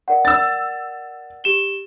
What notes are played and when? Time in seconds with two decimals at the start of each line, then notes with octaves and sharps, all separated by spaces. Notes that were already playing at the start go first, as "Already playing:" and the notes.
0.08 A#4 D5 F#5
0.25 E6 A6
1.44 G4 E7 G7